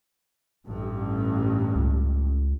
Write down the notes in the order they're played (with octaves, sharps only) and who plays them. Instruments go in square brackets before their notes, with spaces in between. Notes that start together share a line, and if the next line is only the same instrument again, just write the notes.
[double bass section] A1 G2
[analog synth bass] C#2